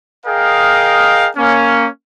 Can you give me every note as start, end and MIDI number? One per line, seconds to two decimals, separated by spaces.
0.26 1.29 68
0.26 1.29 70
0.26 1.29 75
0.26 1.29 77
0.26 1.29 79
1.37 1.86 58
1.37 1.86 61